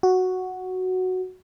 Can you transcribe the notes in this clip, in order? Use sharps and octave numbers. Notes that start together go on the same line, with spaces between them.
F#4